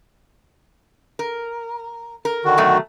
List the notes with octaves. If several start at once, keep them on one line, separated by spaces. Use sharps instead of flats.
A#4
A#4
D3 D#3 F#4
B2 F#3 A3